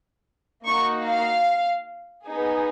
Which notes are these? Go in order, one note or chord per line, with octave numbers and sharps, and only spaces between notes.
A#3 D#4 F#4 C#6
F5
B3 D#4 G#4